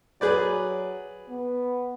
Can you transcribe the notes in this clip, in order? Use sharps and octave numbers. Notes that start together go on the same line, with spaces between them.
F#3 G#4 B4 D5
B3